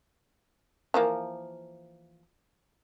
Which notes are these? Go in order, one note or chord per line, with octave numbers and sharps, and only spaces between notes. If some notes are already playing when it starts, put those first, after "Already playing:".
E3 F3 A#3